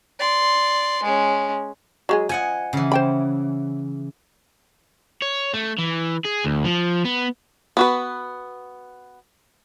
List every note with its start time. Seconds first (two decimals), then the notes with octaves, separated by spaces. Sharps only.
0.19 D5 C6
1.03 G#3 C#4
2.09 F#3 G#3 G#4
2.29 F3 D#5 F#5 G#5
2.73 C#3 E3
2.92 C5 G5 B5
5.22 C#5
5.54 A3
5.79 E3
6.25 G#4
6.44 D2
6.65 F3
7.05 B3
7.77 B3 F#4 B4